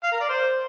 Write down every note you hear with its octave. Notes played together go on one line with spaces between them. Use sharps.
F5
A#4
D5
C5